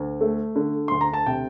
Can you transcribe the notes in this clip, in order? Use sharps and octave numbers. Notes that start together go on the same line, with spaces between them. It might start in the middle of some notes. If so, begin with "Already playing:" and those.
Already playing: D2
A3
D3
D2 C6
A#5
A5
C3 G5